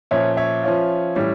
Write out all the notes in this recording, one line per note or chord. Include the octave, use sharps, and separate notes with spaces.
A#2 F3 C#4 C#5 E5
C#5 E5
F3 C#4 F4
A2 E3 G3 C#4